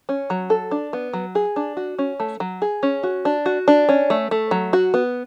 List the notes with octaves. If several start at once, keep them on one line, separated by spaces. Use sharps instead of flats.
C#4
F#3
A4
D4
B3
F#3
G#4
D4
F#4
C#4
A3
F#3
G#4
C#4
F#4
D4
F#4
D4
C#4
A3
A3
F#3
F#4
B3